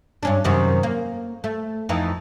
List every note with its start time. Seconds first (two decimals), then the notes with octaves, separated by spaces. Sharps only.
0.23 G2 C#4 D4
0.44 F#2 C3 D#3
0.83 A#3
1.44 A3
1.89 F2 E3 D#4